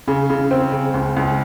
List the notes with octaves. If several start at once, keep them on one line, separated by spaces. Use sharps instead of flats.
C#3
C#3
C4
C#3
C#2
C#2